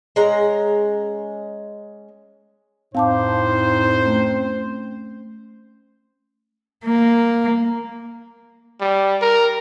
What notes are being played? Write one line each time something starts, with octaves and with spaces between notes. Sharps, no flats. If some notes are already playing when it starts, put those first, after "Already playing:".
G#3 C#4 A#5
F2 A2 C4 D#4 C5 F5 A5 D6
A3 C#4
A#3
G3
A#4